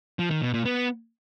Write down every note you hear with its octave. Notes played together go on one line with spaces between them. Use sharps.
F3
D#3
B2
A#2
B3